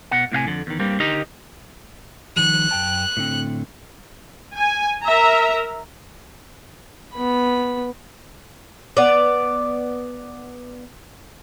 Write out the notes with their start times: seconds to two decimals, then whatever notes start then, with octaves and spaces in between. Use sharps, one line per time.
0.11 B2 F#5
0.32 A2 C3 F5 G#5
0.47 F2 D3
0.67 E2 D#3
0.79 G2 G3 A#3 C4
1.00 D3 D#4 G4 A#4 D#5
2.36 D#3 F3 G3 F#6
2.71 F#2 G5 A5
3.17 A2 D3 C4
4.56 G#5
5.04 A#4 E5 A#5
7.14 B3 B5
8.97 B3 D5